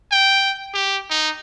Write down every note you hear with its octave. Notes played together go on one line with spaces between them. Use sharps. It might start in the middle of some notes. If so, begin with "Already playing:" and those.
G5
G4
D#4